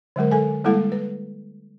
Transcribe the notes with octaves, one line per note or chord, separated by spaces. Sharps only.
D3 F#3 G#3 A#4
A4 G#5
G3 G#3 A#3 E4 A4 F#5
B4